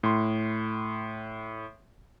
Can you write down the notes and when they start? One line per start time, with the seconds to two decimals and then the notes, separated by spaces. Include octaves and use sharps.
0.03 A2 C6